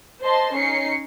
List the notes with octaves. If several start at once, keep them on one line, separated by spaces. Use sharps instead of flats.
C5 D#5 A5 C6
C#4 D#4 C7 C#7